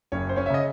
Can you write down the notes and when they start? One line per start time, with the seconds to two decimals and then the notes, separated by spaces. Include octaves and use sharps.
0.12 F#1 C#4 C#5
0.29 C5
0.36 C#4 C#5
0.46 E5
0.50 C#3 D#5